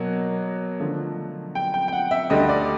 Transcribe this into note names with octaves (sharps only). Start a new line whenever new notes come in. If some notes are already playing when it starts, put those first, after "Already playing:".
Already playing: B2 F#3 A#3
D3 F3 A3
G5
G5
G5
F#5
E5
D2 D3 G3 D#5
D5